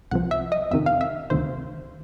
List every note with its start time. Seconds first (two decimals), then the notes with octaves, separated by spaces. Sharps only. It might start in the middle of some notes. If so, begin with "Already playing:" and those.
0.11 C2 C3 F3 F#5
0.31 E5
0.52 D#5
0.71 F2 C3 D#3 E5
0.86 F5
1.01 E5
1.30 D2 C3 D#3 C5